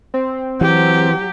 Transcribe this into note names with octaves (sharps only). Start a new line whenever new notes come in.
C4
E3 F#3 G4